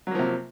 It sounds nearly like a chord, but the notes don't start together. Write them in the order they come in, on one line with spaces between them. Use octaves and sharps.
F#3 A#3 F3 C3